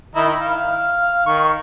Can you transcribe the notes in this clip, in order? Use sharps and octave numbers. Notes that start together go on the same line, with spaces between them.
D#3 D#4 E4
F5
D#3 C#6